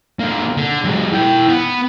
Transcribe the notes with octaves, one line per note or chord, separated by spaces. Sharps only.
D3 A#3
D3
F#3 G#3
E4 G5
B3